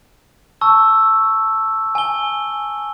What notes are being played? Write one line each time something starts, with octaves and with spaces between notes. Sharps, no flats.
A5 C#6 E6
G#5 G7